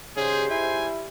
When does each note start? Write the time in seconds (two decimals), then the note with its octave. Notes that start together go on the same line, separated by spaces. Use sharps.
0.17 G#2 C#3 G3 G#4 C5
0.51 E4 G#5